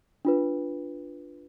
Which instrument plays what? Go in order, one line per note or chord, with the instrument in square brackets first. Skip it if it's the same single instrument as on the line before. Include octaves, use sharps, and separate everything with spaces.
[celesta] D4 F4 B4